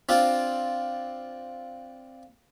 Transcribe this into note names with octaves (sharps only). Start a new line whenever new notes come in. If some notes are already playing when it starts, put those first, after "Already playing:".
C4 D4 F4